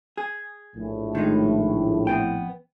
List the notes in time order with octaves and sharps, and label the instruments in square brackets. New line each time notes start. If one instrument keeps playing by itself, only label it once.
[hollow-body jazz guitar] G#4
[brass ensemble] A#1 A2
[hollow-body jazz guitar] D#3 G#3 D#4
F2 B3 G5